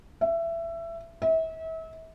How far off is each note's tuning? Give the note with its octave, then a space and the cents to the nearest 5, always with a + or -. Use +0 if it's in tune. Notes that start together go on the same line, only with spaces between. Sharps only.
E5 +20
E5 -35